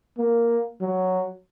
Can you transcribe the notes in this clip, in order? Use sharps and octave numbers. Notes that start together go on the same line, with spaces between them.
A#3
F#3